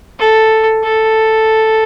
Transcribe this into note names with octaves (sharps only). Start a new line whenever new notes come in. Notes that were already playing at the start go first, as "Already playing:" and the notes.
A4
A4